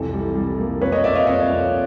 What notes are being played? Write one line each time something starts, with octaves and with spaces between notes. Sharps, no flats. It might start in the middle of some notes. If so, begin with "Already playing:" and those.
Already playing: C2 F2 E3 A4
G3
G3
A#3
F2 B4 C#5
C#5 D#5
F2 D5 E5
D#5 F5
F2 C#5 D#5
F2